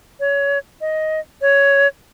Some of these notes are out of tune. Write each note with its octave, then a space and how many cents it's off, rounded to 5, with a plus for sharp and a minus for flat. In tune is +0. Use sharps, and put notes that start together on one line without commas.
C#5 +25
D#5 +10
C#5 +10